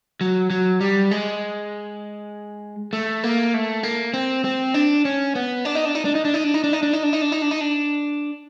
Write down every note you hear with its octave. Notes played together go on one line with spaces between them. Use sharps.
F#3
F#3
G3
G#3
A3
A#3
A3
A#3
C4
C4
D4
C#4
B3
D4
D#4
D4
D#4
D4
D#4
D4
D#4
D4
D#4
D4
D#4
D4
D#4
D4
D#4
D4
D#4
D4
D#4
D4